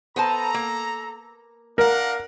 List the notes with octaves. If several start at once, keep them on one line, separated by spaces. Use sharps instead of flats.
B3 A4 C5 A5 A#5
A#3
D4 A#4 F5 F#5